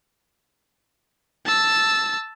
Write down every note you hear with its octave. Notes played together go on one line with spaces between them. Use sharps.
A5 E6